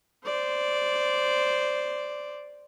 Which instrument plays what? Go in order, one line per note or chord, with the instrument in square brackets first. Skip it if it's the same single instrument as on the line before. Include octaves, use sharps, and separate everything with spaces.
[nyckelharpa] C5 D5